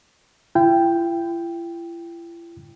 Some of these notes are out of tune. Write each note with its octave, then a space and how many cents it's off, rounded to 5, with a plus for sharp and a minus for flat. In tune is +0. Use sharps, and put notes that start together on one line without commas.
E4 +45 G5 +0